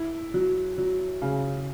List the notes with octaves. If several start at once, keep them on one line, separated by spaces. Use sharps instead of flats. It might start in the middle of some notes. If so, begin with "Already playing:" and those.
Already playing: E4
F#3
F#3
C#3